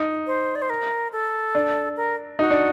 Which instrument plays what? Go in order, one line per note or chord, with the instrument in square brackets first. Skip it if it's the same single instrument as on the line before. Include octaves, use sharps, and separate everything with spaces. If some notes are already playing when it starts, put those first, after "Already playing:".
Already playing: [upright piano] D#4
[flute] C5
D5
C5
A#4
A4
[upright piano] D4
[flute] A#4
[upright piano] D#4 [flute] F#4
[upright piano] D4